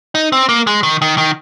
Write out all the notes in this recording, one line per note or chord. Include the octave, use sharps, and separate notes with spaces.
D#4
C4
A#3
G#3
D#3
D#3
D#3